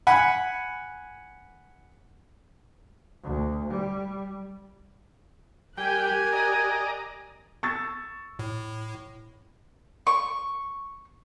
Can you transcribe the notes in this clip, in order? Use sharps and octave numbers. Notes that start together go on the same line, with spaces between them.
F#5 G#5 B5
D2
G3
G3 G4 A#4 G5 G#5 F#6
D5 D#5 A#5
C#6 E6 A6
A2
C#6